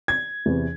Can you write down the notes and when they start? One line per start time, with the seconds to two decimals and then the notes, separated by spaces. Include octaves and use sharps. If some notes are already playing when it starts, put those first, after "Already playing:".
0.08 G#6
0.46 E2 C3 E3